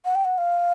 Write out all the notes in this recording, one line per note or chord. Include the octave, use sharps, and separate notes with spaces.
F#5
G5
F#5
F5